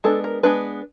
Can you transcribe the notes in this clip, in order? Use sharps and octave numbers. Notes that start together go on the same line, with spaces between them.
G#3 B3 D4 A4
A#4
G#3 B3 D4 B4